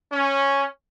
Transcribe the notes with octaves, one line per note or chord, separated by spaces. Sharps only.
C#4